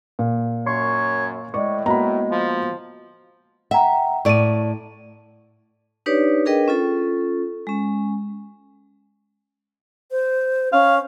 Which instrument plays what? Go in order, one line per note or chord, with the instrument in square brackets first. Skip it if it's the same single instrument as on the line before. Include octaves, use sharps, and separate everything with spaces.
[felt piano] A#2
[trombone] F#2 [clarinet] C#5 [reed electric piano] C6 C#6
[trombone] A2 [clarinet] G#3 [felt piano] D5 [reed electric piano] C#6
[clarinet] G#3 [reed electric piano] A#3 B3 F#4 [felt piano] A#5 B5
[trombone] F3
[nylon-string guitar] E5 [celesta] F#5 G5 A#5
[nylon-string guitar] A2 D5 [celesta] C#6 D#7
[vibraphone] D4 D#4 G4 B4 C#5 D5
D4 G#4 A#4 B4 D#5 G5
C#4 F4 A4
G#3 C#4
[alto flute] C5
[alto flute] C#4 [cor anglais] F5